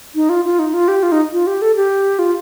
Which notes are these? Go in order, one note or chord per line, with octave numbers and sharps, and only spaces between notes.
D#4
F4
F4
D#4
F4
G4
F4
D#4
F4
G4
A4
G4
F4